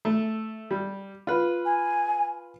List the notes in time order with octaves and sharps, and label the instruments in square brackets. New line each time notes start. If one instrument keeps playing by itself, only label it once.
[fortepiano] A3
G3
F4 B4
[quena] G#5